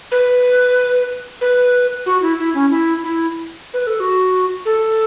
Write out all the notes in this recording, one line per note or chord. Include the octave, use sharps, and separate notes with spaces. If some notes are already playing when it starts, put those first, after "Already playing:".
B4
B4
F#4
E4
E4
C#4
E4
E4
B4
A4
F#4
A4